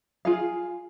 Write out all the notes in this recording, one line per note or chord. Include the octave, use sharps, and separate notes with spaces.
F4 G#4 F5